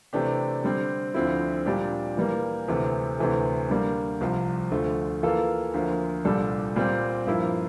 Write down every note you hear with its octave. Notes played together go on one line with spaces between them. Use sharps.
C3 E3 A3 D4 G4
D3 G3 C4
D2 D3 F3 C4 E4
A#2 G3 D4 G4
E3 G3 A#3
D2 C3 E3 A3
D2 C3 E3 A3
D3 G3 A#3
C2 C3 F3
D2 D3 F3 A3
E3 A#3 F4 A4
D2 D3 F3 A#3
C2 A#2 G3 D4 A4
A#2 G3 C4
G2 F3 A#3 E4